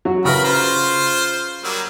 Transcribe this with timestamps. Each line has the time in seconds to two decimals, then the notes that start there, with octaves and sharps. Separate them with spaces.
0.05 F#3 F#4
0.25 C#3 A#4 B4 B5
0.44 F4 C5
1.64 F#3 G3 A#3